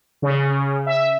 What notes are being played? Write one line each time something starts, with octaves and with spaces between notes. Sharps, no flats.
C#3
E5